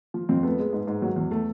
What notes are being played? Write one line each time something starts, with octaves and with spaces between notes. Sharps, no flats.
F3
F2 C4
A3 B3
G#3
G#2
G#2
F#3
E2
A3